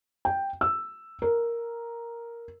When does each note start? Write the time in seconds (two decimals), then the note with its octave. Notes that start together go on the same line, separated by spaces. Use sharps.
0.25 G5
0.61 E6
1.22 A#4